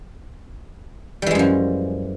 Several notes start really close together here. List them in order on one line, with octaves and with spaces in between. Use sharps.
G3 E3 G#3 F#2 F3